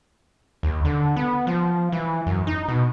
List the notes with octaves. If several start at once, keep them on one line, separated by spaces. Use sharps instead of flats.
D#2
D3
B3
F3
E3
F#2
D#4
B2